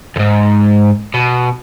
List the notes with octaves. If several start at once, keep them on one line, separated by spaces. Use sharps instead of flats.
D#2 G#2
B2